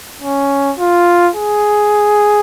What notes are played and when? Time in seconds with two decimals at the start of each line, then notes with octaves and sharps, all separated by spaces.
0.22 C#4
0.78 F4
1.35 G#4